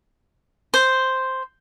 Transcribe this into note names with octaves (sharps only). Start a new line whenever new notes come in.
C5